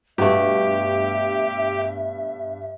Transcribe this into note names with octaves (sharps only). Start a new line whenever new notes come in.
G2 B2 A3 G4 E5